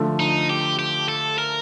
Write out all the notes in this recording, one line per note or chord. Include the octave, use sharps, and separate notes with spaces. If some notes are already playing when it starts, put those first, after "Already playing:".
Already playing: D3 F3 A3
D#4
G4
G4
A4
A#4